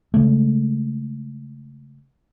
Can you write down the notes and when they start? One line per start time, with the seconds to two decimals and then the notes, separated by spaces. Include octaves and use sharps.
0.14 C#3 G#3 A3